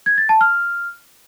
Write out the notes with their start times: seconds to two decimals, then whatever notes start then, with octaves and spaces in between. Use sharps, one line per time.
0.06 G#6
0.18 A6
0.29 A5
0.41 F6